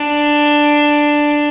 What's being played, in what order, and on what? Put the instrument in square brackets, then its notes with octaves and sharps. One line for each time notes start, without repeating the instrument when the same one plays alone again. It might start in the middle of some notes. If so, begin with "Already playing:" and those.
Already playing: [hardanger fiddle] D4